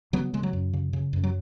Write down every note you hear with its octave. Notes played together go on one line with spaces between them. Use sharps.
C#3 F#3 B3
C#3 G#3
F#3
F#2
C#3
C#3
F#2
F#3